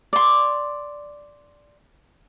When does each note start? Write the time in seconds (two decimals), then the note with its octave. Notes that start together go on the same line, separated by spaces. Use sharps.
0.13 D5 C6